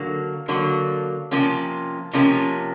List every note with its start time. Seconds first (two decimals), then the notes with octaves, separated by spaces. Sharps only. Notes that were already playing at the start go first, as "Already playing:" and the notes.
Already playing: D3 F#3 A#3
0.48 D3 F#3 A#3
1.31 C3 F3 A#3 C#4
2.13 C3 F3 A#3 C#4